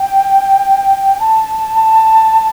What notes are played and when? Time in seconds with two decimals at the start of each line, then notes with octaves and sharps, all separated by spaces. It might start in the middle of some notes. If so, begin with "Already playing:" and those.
Already playing: G5
1.20 A5